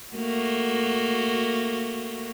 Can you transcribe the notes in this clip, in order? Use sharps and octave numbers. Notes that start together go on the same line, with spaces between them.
A3 A#3 F#4